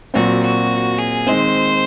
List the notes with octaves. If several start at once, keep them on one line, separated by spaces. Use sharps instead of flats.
A#2 F#3 C4 F#4
F#4
G#4
D#3 G#3 C4 C5